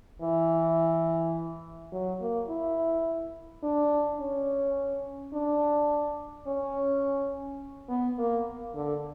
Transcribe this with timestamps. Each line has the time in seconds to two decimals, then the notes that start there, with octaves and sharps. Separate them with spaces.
0.22 E3
1.92 F#3
2.21 A#3
2.49 E4
3.63 D4
4.20 C#4
5.33 D4
6.47 C#4
7.89 B3
8.18 A#3
8.75 D3